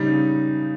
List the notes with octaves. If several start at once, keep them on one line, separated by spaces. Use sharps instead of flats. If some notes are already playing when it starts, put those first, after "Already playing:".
Already playing: C#3 G3 D#4
C#3